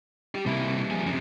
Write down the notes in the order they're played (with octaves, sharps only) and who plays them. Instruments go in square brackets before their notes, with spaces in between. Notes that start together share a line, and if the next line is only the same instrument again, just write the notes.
[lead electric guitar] G4 D5
[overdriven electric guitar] C3 E4 [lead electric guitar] G3 A#3
[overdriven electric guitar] F3 G#4
[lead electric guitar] F#2 C3